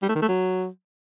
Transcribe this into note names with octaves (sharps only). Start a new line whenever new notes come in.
G3
A3
D#3
A3
F#3